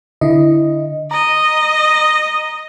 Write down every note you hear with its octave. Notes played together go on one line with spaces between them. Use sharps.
D3 E4 D#5
D#5 A#5